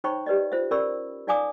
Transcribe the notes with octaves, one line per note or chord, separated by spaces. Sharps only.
D#4 C5 C#5 G5 B5 C#6
G4 B4 D5 D#5
F4 C5 E5
C#4 A#4 D5 B5 C#6 E6
D#4 D5 F5 G#5 D6 D#6